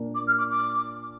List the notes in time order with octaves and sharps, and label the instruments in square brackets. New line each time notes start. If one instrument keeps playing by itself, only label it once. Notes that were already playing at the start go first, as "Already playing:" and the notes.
Already playing: [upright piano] A#2 A#3 D4
[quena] D6
F6
D6
D6